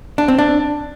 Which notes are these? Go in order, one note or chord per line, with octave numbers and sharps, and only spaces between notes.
D4
C4
D4